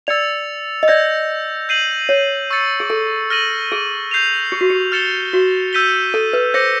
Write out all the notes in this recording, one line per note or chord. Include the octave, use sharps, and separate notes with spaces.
D5 E6 A6 C#7 F7
D#5
D5 E6 G6 A#6
G6 C7 D#7 F#7
C#5
C#6 E6 A6 C#7
G#4
A4
F6 A#6 D#7 F#7
G#4
G6 C7 F7
G4
F#4
G4
F6 A6 C#7 E7 G7
F#4
E6 G6 B6 D#7 G7
A4
B4
C5 D6 G6 A#6 C#7